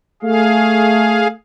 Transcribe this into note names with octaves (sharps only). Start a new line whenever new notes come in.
A3 G#4 F5